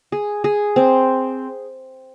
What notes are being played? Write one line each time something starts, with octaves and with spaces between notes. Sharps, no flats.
G#4
G#4
C4